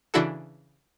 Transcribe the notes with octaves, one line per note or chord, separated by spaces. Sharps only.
C#3 E3 D4 E4 F#4 A4